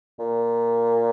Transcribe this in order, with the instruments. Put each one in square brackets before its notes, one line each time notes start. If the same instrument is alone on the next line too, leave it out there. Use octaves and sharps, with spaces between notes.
[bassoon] A#2